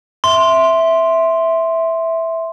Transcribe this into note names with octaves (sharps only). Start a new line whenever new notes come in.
E5 C6